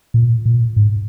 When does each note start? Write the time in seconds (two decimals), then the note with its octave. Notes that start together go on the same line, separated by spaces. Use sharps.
0.14 A#2
0.45 A#2
0.76 G#2